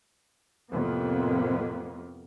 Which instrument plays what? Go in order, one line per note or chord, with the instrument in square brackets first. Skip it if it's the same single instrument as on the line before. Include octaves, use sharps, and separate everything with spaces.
[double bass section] F2 A2 C3 A#3 B3